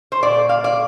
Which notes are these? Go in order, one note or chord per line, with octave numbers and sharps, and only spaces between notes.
C5
A#2 D5
F5
D5